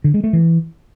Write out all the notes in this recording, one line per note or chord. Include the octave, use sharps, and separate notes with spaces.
D3
G#3
A3
E3